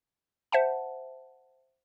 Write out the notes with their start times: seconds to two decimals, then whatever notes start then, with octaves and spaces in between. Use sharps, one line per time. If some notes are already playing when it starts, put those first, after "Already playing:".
0.52 C5 E5 F#5 A5